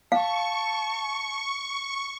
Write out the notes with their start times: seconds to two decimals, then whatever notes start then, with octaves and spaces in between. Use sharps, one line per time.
0.12 F5 A5 C#6